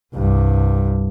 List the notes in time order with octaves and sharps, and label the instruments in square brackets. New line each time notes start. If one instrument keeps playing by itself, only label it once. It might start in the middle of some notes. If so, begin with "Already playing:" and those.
[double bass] C2 G2